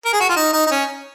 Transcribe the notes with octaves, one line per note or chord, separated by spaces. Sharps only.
A#4
G#4
F#4
F4
D#4
D#4
D#4
C#4